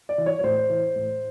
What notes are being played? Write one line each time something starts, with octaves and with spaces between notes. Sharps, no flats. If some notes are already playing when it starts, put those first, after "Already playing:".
D5
E3
C#5
C#5
A2 C5
E3
A2